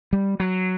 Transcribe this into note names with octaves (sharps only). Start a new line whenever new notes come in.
G3
F#3